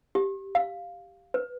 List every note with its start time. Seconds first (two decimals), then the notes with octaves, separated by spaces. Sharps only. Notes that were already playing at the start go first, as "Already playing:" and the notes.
0.15 G4
0.55 F5
1.34 B4